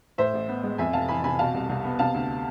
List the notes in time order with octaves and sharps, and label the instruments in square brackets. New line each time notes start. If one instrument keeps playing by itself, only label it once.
[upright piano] A2 C5 E5
A1
B3
G#3
F2 E5 G#5
F1 F5 A5
E3 G#5 B5
C3 G#5 B5
B2 F5 A5
C2
C2
B3
C3 F5 A5
D2